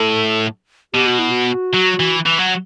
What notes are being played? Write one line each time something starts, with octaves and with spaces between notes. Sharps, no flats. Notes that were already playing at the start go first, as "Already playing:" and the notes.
Already playing: A2 A4
B2 G4
F#4
E4
F#4
F#3
E3
E3
F#3